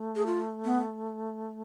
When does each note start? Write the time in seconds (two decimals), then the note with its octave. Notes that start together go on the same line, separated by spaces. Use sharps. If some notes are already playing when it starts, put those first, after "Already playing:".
Already playing: A3
0.16 G#4
0.26 F4
0.65 B3